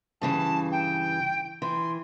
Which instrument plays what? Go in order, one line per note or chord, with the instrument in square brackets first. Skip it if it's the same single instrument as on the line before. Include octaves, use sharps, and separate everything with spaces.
[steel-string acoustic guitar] G2 C#3 E3 [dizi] A5
[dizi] G5
[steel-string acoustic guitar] E3 [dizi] C6